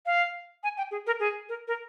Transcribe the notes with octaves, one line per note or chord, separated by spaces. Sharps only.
F5
G#5
G5
G#4
A#4
G#4
A#4
A#4